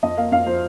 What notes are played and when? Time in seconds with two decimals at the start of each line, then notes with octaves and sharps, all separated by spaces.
0.03 F2 D#5
0.17 A#3 F5
0.32 F2 F5
0.46 F3 C5